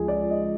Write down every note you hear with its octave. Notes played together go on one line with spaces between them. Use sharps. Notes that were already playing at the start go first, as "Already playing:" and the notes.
Already playing: C#2 F3 G#4
D5
D#5